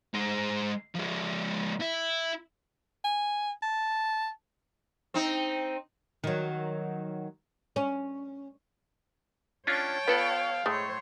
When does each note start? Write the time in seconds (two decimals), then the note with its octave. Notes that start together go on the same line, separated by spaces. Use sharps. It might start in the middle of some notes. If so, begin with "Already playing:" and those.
0.14 G#3 C5
0.95 F3 G#3
1.80 E4
3.04 G#5
3.63 A5
5.14 C4 D#4
6.24 D#3 F#3
7.76 C#4
9.67 C#4 D4 F4 C#5 G5 A5
10.08 B3 F4 A4 B4 D5 F5
10.66 A2 G#3 A3 C5 C#5